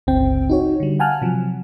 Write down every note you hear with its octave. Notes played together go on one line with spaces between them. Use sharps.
G1 C#2 C#3 C4 G5
D#4 F#4 C#5
D3 G3
F5 F#5 G#5 A5 F6 F#6
C3 F3 F#3